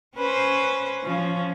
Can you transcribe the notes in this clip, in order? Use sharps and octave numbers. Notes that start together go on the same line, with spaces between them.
C#4 B4 C5
F3 C#4